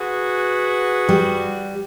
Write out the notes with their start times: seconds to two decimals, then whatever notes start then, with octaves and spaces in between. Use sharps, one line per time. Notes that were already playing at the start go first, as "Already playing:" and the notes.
0.01 F#4 G#4 B4
1.09 G3